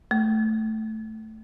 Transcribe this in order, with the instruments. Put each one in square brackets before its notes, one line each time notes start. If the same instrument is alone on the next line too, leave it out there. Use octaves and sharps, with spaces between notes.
[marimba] A3